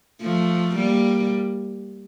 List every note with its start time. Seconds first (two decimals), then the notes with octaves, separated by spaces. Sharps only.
0.21 F3 A3
0.76 G3 A#3